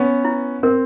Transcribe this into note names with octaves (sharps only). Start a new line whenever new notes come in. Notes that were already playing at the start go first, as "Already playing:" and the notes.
Already playing: B3 C#4 B4
E4
C4 A#4